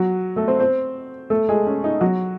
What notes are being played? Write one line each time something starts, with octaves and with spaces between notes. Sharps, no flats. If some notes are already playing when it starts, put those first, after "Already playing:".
Already playing: F#3 F#4
A3 A4
C4 C5
C4 C5
A3 A4
G#3 G#4
C#4
D#4
F#3 F#4